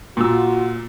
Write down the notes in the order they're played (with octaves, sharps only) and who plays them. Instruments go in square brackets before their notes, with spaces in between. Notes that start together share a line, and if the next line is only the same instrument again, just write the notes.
[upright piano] A#2 E6 [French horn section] F4 F#4